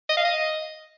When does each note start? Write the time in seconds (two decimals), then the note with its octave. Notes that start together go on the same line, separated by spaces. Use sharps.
0.09 D#5
0.17 F5
0.25 D#5